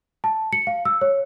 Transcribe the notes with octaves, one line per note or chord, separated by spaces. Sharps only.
A5
C#7
F5
E6
C#5